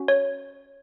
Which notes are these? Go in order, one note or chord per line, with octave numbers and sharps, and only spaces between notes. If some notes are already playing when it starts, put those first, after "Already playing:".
Already playing: C#4 F#4
C#5